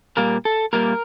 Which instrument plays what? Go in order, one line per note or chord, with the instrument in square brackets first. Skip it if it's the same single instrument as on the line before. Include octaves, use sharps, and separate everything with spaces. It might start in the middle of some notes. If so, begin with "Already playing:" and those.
[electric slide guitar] A#2 G3 A#3 A#4
A4
A#2 G3 A#3 A#4